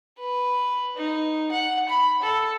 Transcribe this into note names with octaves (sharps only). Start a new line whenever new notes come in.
B4
D#4
F#5
B5
A4